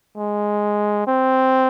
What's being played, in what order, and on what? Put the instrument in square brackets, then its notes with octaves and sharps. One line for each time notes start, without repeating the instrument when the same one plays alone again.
[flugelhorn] G#3
C4